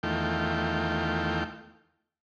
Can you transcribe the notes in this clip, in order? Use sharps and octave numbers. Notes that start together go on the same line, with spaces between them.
E2 D#3 A3 F4 G5